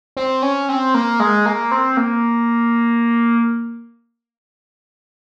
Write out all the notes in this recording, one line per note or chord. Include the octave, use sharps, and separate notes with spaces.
C4
C#4
C4
A#3
G#3
A#3
C4
A#3